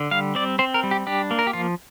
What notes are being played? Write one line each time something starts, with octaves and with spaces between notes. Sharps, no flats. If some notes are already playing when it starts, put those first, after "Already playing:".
Already playing: D3
G3 F5
C4 D5
C4 C5
A#4
G3
G4
D4 G4
A#3
A#4
G4
F3 F4